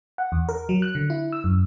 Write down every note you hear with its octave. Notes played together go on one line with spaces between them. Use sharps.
F#5
E2
A#4
F#3
F#6
D3
E4
E6
F#2